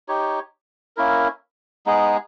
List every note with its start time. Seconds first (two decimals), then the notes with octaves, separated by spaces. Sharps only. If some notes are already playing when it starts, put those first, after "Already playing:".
0.08 D#4 G4 C#5
0.97 A#3 C#4 E4 A#4
1.86 G#3 B3 D#4 G#4